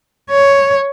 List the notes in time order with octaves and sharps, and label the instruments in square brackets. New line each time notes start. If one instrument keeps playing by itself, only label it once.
[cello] C#5